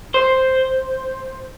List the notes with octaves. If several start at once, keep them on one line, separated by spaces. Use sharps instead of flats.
C5